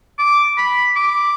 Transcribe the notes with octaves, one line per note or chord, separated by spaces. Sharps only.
D6
B5
D6